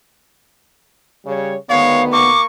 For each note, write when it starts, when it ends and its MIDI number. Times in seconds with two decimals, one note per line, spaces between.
1.26 1.55 49
1.26 1.55 55
1.26 1.55 73
1.69 2.29 38
1.69 2.29 51
1.69 2.01 56
1.69 2.29 59
1.69 2.01 73
1.69 2.05 77
2.12 2.45 58
2.12 2.45 85
2.12 2.40 86